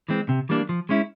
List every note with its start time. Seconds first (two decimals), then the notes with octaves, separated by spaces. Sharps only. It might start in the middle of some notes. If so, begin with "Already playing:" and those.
0.09 E3 G#3 C4
0.29 C3
0.49 E3 G3 A#3 D4
0.69 F3
0.89 G#3 C#4 E4